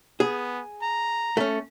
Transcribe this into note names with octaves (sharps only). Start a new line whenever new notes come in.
B3 G#4
A#5
A3 C#4